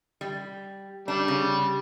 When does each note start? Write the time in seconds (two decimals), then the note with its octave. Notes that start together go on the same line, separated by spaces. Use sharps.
0.21 G3
1.08 G3 D4
1.28 C#3